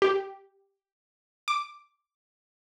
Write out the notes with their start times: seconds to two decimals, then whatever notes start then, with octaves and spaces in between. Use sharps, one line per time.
0.02 G4
1.48 D6